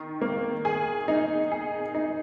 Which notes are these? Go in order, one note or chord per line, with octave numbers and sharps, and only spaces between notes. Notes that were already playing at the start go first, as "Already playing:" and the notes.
Already playing: D#3
A#3
G#4
D#4
G#4
D#4